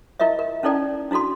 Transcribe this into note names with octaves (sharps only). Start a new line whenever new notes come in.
E4 F4 A#4 D#5 E5
A#4
C#4 D#4 E4 A4 D5 G5
D4 E4 F#4 A4 C6